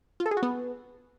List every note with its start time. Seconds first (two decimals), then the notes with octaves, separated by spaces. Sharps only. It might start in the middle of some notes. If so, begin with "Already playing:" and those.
0.20 F4
0.26 A4
0.31 G#4
0.37 F#4
0.43 B3